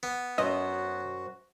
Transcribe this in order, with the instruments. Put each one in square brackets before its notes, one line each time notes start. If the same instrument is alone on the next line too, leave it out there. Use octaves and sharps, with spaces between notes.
[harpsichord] B3
[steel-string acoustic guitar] F#2 C5 [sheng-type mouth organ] F#4 [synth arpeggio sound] D#5